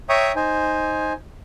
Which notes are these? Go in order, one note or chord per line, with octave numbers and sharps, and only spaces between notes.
C#5 E5 G5 A#5 C#6 D#6
D#4 C5 G#5